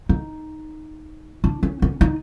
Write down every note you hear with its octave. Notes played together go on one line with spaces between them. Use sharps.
D#4
D4
C#4
C#4
D#4